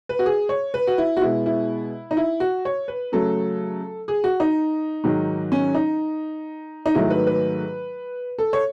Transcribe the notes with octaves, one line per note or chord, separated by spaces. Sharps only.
B4
F#4
G#4
C#5
B4
F#4
E4
F#4
B2 G#3 B3 E4
E4
D#4
E4
F#4
C#5
B4
C#3 F#3 A3 A4
G#4
F#4
D#4
G#2 D#3 F#3
C#4
D#4
D#4
G#2 D#3 F#3 A3 E4
B4
B4
A4
C#5